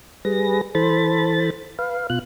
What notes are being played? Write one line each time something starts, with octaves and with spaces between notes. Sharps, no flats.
G3 G#4 B4 A#6
E3 A4 C5 B5 A6
B4 F5
B2 F4 F#6